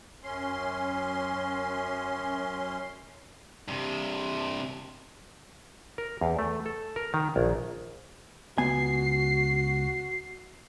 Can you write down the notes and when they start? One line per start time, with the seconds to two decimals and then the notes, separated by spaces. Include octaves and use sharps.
0.24 F#2 C#4 C6
3.68 G2 C3
5.98 A#4
6.21 E2
6.39 A3
6.66 A4
6.96 A#4
7.14 D#3
7.36 A#1
8.58 C#2 B3 F#4 G#5 C7